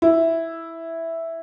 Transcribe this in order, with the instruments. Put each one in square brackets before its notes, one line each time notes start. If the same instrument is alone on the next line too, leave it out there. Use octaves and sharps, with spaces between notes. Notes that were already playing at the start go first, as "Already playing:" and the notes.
[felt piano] E4